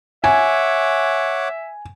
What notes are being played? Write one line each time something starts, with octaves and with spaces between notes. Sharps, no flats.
C#5 E5 F#5 G#5 D6